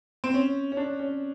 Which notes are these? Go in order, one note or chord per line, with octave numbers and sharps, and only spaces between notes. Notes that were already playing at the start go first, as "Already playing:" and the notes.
C4
C#4
C#4
D4
C#4